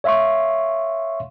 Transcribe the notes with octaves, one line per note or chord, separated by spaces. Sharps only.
C#5 E5 F5 C6 C#6